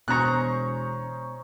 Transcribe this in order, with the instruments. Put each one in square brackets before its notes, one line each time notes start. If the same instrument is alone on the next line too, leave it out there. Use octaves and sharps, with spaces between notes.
[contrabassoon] E1 [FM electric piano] B2 C#6 [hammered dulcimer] C#4 D#4 C5 [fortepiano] A#5 F#6